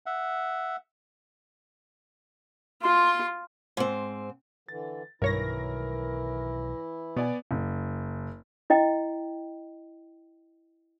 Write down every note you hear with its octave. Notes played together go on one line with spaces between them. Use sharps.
E5 F#5
F4 C6
G#2 C4
D3 E3 A6
B1 G2 D#3 E3 E4 A#4 C#5 A#6
B2 B3 D5 G#5
F#1
E4 D#5 G5